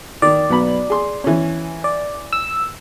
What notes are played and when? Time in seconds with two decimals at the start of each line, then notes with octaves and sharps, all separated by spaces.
0.22 D#3 D5
0.50 B1 B3 B5
0.90 G#4 C6
1.24 E3 C#4
1.84 D5
2.33 E6